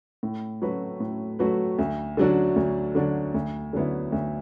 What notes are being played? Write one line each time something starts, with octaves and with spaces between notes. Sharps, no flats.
A2
F#3 A3 F#4 B4
A2
F#3 A3 F#4 B4
D2
D3 F#3 D4 F#4
D2
D3 F#3 D4 F#4
D2
D3 F#3 B3 E4
D2